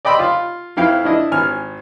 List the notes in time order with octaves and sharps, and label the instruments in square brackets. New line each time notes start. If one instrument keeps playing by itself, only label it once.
[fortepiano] D5 D#5 G5 B5 C6 E6
F4
F2 E4 F5 G5
D4 E4 D#5
G#1 G#5 F6